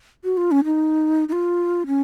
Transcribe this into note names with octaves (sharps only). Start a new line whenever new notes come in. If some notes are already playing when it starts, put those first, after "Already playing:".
F#4
F4
C#4
D#4
D#4
F4
C#4